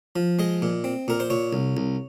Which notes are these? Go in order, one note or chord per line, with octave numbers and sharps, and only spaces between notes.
F3
G#3 D#5
A#2
C4
A#2 A#4
C5
A#2 C#5
C2
C2